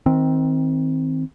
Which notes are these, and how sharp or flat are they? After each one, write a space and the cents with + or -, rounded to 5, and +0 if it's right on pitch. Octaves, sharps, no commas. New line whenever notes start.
D#3 +30 C4 +0